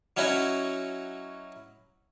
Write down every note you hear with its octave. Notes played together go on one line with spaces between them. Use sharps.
F#3 C#4 D#4 E4 F#4 C#5